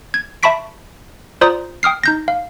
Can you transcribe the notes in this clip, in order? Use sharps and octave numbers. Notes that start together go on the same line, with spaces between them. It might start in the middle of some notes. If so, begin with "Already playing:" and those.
G#6
E5 A5 B5 C#6 B6 D7
F4 C5 D5 A#5 D#6
G5 D#6 F6 C7
D#4 G6 A#6
F5